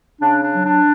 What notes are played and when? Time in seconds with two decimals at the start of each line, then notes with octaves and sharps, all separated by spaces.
0.21 C#3 D4
0.43 D4
0.54 F#3
0.65 D4